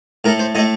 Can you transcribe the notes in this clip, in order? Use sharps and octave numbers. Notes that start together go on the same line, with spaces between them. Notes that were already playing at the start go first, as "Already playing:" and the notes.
A2 A3 A#4
C5
A2 A3 D#5